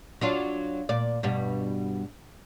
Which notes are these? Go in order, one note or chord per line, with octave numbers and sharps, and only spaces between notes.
F#3 D4 F4
A#2 D5
G2 B2 G3